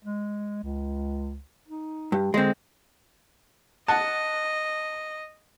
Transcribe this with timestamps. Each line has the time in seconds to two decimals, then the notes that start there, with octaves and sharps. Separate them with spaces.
0.05 G#3
0.63 C#2
1.68 D#4
2.12 G2
2.34 D3 G#3 C4
3.88 D#5 F#5 A5